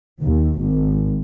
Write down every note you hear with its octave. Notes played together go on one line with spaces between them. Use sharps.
D#2
G#1